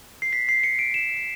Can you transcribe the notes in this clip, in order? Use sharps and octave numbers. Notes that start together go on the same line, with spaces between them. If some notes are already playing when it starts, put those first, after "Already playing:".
C7
B6
C7
C#7
D7
E7